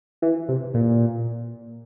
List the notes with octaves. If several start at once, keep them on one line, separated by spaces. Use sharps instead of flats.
E3
C3
A#2